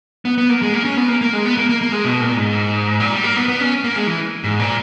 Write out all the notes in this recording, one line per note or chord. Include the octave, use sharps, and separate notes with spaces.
B3
B3
A#3
G#3
A#3
C#4
B3
A#3
A#3
G#3
B3
A#3
A#3
A#3
G#3
B2
A#2
G#2
A#2
G3
A#3
B3
B3
C#4
A#3
G#3
E3
G#2
A#2